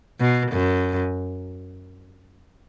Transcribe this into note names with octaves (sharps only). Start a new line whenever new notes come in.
B2
F#2